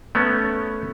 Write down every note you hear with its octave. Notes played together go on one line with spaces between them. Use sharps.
A3 B3 C#4